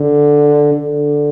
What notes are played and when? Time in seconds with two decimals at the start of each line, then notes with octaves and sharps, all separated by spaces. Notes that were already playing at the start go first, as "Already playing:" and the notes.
Already playing: D3
0.73 D3